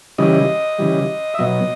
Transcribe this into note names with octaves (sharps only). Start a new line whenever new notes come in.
C#3 E3 G3 D#5
C#3 E3 G3
E5
B2 F#3 D#5